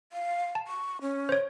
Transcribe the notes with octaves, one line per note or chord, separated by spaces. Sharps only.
F5
A5
C#6
C#4
C5 C#5